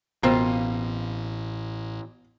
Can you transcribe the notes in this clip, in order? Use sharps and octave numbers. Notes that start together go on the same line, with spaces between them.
A1 B2 A#3 C4 F4